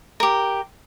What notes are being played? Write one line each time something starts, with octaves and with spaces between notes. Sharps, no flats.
G4 A#4